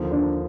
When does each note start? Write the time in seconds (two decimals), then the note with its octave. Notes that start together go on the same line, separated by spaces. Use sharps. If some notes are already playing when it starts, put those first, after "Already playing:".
Already playing: D#2 D3 F3
0.11 D4